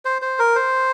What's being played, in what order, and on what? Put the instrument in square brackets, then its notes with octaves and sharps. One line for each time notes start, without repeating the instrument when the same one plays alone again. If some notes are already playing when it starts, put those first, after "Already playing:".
[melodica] C5
C5
A#4
C5